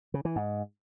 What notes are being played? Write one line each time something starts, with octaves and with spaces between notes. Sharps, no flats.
C#3
E3
G#2